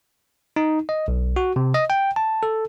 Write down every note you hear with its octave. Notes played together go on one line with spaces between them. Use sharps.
D#4
D#5
B1
F#4
C3
D#5
G5
A5
A4